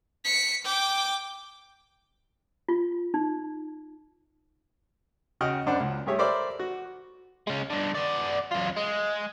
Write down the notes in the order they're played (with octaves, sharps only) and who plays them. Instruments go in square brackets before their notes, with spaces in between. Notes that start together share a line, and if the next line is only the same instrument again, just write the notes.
[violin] B6 C#7
G5 D6
[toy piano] F4
D#4
[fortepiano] C#3 F#4 D#5 F#5 G5 F6
F#2 D4 C5 F#5 B5
C#2
G2 A3 G4 G#4 C#5 E5
A4 A#4 C5 D5 E5 B5
F#4
[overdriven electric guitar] G#3 C#4
G2 D3
B3 D5
F#2 F4
G#3